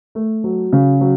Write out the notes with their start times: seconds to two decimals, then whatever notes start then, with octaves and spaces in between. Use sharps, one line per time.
0.15 A3
0.44 F#3
0.73 C#3
1.01 F#3